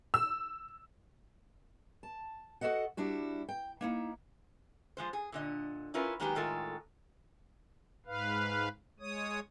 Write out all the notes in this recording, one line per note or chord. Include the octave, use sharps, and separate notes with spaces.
E6
A5
F#4 G#4 A4 D#5 F#5
G3 D4 E4 F#4
G5
A#3 D#4 E4
F3 G#3 C5
G#4
A#2 D3 D#5
C#4 E4 F4 A#4 B4
D#3 F#3 G#3 A#3 B3 G4
A2 D#3 G#3 F4 A4 A#4
G#2 B4 F5
G#3 C#5 D#6